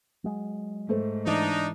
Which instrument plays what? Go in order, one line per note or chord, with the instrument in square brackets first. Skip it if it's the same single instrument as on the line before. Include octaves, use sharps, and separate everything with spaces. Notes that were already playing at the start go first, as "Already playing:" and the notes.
[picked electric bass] F#3 G#3
[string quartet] G#2 [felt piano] A3 A4 C5
[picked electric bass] E3 [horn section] D4 D#4